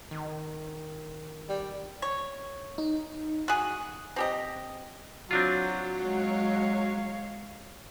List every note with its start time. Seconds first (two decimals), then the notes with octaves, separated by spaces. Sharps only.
0.11 D#3
1.49 G3
2.02 C#5
2.78 D#4
3.48 F#4 G#4 F#6
4.16 C4 G4 D#5
5.31 F#3 C4 D4 F4
6.03 G#3 C#5 F5